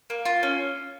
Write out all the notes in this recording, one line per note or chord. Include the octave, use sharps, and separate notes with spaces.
A#3
F4
C#4